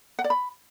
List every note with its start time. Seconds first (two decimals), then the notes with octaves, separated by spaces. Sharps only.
0.19 F#5
0.24 D5
0.30 B5